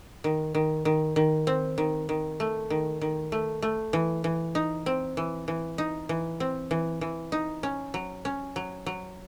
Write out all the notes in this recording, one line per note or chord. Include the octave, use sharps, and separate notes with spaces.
D#3
D#3
D#3
D#3
C4
D#3
D#3
A3
D#3
D#3
A3
A3
E3
E3
D#4
C4
E3
E3
D#4
E3
C4
E3
E3
D#4
C#4
F#3
C#4
F#3
F#3